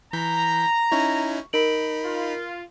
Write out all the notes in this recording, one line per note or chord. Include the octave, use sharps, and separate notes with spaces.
E3 A#5 G6 B6
C#4 D#4 E4 C#6
D#4 A#4 B5 D7 F#7
F4